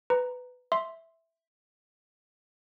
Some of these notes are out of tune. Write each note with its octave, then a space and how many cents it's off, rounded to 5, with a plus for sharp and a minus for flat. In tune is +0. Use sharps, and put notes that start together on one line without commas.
B4 +15 A#5 +0
E5 +0 C6 +0